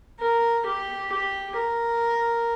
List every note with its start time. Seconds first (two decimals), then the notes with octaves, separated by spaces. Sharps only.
0.20 A#4
0.66 G4
1.12 G4
1.57 A#4